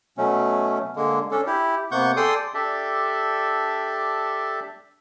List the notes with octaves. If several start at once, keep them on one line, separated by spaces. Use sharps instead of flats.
B2 F#3 A3 C#4
D3 G#3 A#3
C#4 D4 A4
E4 G4
C3 A#3 B3 F#5 C#6 G6
G#4 A4 D5 G5 C6 D#6
D4 G4 A4 D5 E5